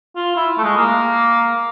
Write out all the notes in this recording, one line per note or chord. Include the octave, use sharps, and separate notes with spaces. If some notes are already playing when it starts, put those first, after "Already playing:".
F4
E4
A3
G#3
A#3